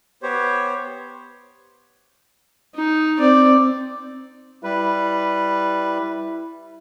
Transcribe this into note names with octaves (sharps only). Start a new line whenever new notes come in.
B3 G4 C5 C#5
D#4
C4 D5
G3 E4 B4